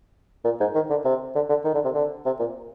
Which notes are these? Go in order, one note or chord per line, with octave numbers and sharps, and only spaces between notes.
A#2
G#2
D#3
D3
C3
D3
D3
D#3
D3
C3
D3
C3
A#2